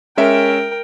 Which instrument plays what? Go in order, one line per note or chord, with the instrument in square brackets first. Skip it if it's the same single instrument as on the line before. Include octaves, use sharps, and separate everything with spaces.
[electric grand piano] G#3 C#4 E5 [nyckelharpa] A#4 G5